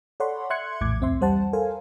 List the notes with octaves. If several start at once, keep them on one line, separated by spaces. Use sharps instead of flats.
A4 C#5 D5 F#5 B5 C6
E5 C6 F#6 G#6 C#7
A#1 E2 A2 D6 G#6
C2 F2 C4 E5 C6
E2 G3 C5 F#5 A5
A4 A#4 C5 F5 G#5